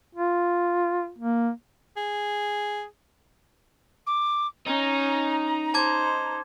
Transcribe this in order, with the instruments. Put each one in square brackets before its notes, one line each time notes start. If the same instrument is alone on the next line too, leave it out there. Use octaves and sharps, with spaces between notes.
[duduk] F4
A#3
[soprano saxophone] G#4
[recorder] D6
[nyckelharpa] C#4 [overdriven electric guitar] D#4 [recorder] A#5
[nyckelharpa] C5 [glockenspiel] A5 D6 G#6